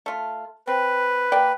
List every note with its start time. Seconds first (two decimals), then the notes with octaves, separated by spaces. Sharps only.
0.06 A3 F4
0.67 C4 B4
1.32 A#3 D5 G5